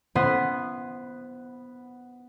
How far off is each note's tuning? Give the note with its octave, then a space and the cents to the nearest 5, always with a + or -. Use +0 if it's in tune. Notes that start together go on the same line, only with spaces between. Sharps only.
B3 +0 E4 +45 C5 +0